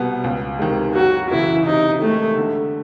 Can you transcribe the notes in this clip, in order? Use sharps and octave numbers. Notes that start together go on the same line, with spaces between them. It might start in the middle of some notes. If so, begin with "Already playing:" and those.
Already playing: C2 B2 G3 B3
C#2
C3 D#3 G#3
F#2 F#4
C#3 E3 E4
C3 D#4
D#3 G#3 A3
D3